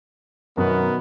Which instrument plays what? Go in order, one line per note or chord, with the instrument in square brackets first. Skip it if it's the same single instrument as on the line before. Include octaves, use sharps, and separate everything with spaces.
[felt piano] F#2 [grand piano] B2 D#3 F#4 [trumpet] B3 [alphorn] A#4